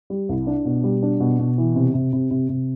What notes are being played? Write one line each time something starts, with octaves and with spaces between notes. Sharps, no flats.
G3
C2
D4
B2
G3
D4
B2
B2
E3
C3
C3
C3
C3
C3